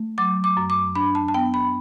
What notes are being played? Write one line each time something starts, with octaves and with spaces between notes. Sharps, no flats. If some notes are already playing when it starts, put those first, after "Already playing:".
Already playing: A3
F#3 D6
D6
F#2
D6
D4 B5
A5
A5
B3 G5
B5